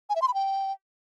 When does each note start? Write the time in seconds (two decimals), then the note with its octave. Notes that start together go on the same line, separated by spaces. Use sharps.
0.09 G#5
0.16 E5
0.22 C6
0.28 B5
0.34 G5